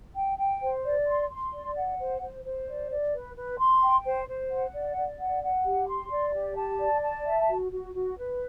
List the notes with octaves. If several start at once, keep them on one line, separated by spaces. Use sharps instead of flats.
G5
G5
C5
D5
C6
C6
D5
F#5
C5
C5
C5
D5
D5
B4
B4
C6
G5
C5
C5
F#5
D5
D5
F#5
F#5
G4
C6
D5
G4
A5
D5
A5
E5
F#4
F#4
F#4
B4